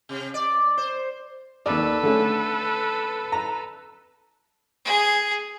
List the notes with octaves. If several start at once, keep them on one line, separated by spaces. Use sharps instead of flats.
C3
D5
C5
D#2 A4 B4 D5
D3 A3 C#4
A#5
G#4